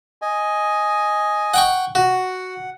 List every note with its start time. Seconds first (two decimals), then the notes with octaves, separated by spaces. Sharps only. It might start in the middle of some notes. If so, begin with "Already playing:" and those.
0.22 D#5 G#5
1.54 F#5 G5 C#6
1.95 F#4 F#5